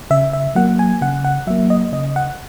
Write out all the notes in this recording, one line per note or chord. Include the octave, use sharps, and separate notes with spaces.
C#3 E5
E5
F#3 A#3 F#5
G#5
C#3 F#5
F#5
F#3 A#3 E5
D#5
C#3 D#5
F#5